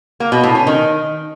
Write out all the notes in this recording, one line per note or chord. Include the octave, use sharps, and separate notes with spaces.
A#3
B2
A2
C#4
D#3